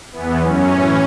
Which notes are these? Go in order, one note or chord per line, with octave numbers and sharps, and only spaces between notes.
E2 E3 B3
F#2 F#3 C#4
A2 E3